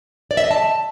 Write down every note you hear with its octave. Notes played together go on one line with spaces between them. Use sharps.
D5
E5
D#5
A5